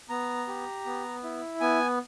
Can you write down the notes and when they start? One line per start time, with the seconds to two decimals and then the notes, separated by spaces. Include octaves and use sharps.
0.09 B3 A#5
0.48 G4
0.86 B3
1.24 E4
1.60 B3 G#5